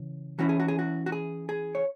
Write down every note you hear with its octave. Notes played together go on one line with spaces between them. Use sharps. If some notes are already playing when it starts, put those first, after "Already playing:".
Already playing: C#3 E3
E3 C#4 E4 F#4
G#4
F#4
G#4
F#4
F#4
G#4
G#4
C#5